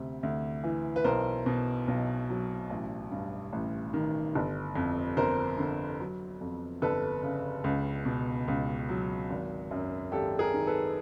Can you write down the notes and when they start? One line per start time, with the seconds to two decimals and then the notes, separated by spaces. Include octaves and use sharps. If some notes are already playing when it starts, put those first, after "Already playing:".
Already playing: D2 C3
0.23 D2
0.64 E3
0.96 B4
1.04 B1 A#4 C5
1.46 B2
1.88 B1
2.29 F#3
2.70 A1
3.11 G2
3.52 A1
3.93 D#3
4.35 G1
4.75 F2
5.17 G1 A#4 C5
5.58 D3
6.00 F#3
6.41 F2
6.82 G1 A4 B4
7.23 C#3
7.64 C#2
8.05 B2
8.48 C#2
8.89 F#3
9.30 G#1
9.71 F#2
10.12 G#1 G4 A4
10.39 G#4 A#4
10.54 D#3
10.67 A4 B4